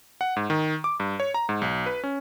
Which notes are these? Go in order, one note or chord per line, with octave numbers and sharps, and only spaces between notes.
F#5
G#2
D#3
D6
G2
C#5
A#5
G#2
B1
B4
C#4